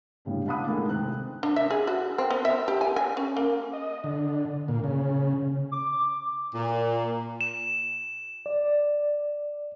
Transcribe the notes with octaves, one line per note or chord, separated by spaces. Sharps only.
A2 C#3 G3 D4
F5 F#5 A5 B5 D6 D#6
A2 D#3 G#3 A3 D#4
C3 C4 F#6
D4
E5
G#4
F#4
C4
B3
E5
G4
G#5
G#5
C#4
A#3
D#5
D3
A#2
C#3
D6
A#2
E7
D5